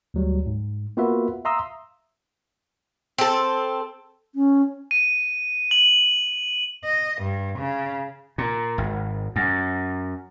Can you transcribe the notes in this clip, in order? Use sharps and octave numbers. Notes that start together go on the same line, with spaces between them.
D2 F#3 G3
G#2
A#3 B3 F4 F#4 B4 E5
E5 F5 A#5 C6 D#6 E6
C4 A4
C#4
D#7
F#7
D#5
G2
C#3
A#2
G#1
F#2